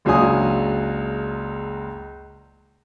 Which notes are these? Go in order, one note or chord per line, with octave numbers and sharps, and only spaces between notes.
F#1 C#2 F#3 D4 G#5 D#6